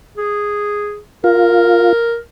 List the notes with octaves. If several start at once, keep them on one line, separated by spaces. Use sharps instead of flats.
G#4
F4 A#4